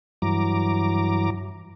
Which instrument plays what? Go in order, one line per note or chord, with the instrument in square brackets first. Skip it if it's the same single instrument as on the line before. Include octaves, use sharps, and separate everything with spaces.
[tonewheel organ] G2 E3 F#3 A#5 D6